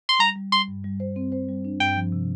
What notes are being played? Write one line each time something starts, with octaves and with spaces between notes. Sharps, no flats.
C6
G3 A#5
G3
G3 C6
G2
G3
C5
C4
C5
G3
D4
G2 G5
F3
C3